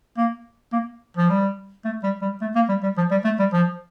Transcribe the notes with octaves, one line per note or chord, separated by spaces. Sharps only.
A#3
A#3
F3
G3
A3
G3
G3
A3
A#3
G3
G3
F3
G3
A3
G3
F3